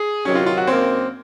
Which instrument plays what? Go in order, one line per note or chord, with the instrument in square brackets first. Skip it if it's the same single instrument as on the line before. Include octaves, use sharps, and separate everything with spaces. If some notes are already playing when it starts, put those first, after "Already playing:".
Already playing: [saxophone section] G#4
[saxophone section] C3 D#3 F#3 [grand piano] C#4
[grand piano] F4
F4
F#4
[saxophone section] F#2 D#3 A#3 [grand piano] C4